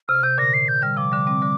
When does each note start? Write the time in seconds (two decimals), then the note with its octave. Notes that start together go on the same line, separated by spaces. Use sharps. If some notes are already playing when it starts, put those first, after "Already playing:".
0.08 C3 F6
0.23 C3 G6
0.38 A#2 D3 A#6
0.54 C7
0.68 G6
0.82 D3 G3 F6
0.97 C3 F3 D6
1.12 D3 G3
1.27 G3 C4
1.42 D3 G3